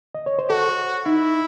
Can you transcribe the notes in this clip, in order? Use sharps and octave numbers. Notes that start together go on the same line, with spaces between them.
D#5
C#5
C5
F#4 A4
D#4 E4